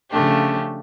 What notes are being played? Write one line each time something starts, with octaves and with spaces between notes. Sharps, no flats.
C#3 F3 A3 D4 G4